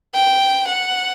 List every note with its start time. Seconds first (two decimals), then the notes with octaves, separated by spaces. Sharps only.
0.14 G5
0.68 F#5